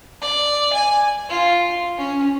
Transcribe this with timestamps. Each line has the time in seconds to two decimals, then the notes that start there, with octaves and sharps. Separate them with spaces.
0.22 D5
0.73 G#5
1.29 F4
1.98 C#4